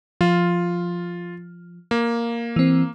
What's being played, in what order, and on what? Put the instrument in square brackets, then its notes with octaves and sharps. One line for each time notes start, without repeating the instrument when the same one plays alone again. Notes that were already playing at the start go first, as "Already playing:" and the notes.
[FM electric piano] F3 [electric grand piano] F4
[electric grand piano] A#3
[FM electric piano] E3 C4